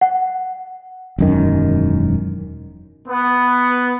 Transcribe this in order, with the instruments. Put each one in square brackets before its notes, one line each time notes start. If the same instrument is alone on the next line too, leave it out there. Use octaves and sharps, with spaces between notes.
[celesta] F#5
[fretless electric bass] E1 F#2 D#3
[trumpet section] B3